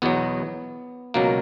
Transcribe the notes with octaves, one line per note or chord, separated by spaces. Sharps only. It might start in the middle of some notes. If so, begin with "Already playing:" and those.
E2 B2 F#3 B3
C#2 B2 F#3 A#3